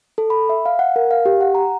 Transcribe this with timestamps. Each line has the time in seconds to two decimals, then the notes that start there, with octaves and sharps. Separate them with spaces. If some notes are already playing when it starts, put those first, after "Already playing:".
0.18 A4
0.30 B5
0.49 E5
0.66 F5
0.79 F#5
0.96 A#4
1.11 F5
1.26 G4
1.41 F#5
1.55 A#5